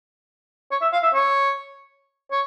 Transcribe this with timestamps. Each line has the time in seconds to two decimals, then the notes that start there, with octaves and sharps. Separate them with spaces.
0.71 C#5
0.82 E5
0.93 F5
1.03 E5
1.14 C#5
2.31 C#5